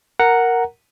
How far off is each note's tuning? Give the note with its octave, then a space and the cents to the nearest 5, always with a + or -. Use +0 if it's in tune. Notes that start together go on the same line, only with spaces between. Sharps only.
A#4 +0 F#5 +0 A#5 -5